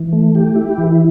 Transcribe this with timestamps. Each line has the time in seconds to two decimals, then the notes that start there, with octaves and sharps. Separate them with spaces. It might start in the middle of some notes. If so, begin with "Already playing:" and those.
Already playing: E3
0.13 A3
0.35 G4
0.56 E4
0.78 E3